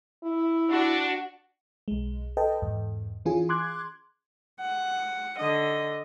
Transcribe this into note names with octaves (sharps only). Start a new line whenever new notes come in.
E4
D4 F#4
B1 G#3
A4 B4 D#5 G5 A5
E2 G#2
E3 C#4 F4 G#4 G#5
C6 D6 F#6 G#6
F#5
D3 D#5